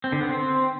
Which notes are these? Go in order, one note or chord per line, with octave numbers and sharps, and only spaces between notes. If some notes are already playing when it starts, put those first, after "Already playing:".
C4
D3
B3
C4